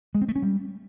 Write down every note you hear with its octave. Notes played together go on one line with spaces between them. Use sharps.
G#3
C4
A3
C#4
G3